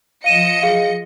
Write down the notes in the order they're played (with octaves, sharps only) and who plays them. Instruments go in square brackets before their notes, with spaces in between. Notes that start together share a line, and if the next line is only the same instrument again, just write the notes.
[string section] F3 D#5 C#7 [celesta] F5 D#7 E7
[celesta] G#4 F5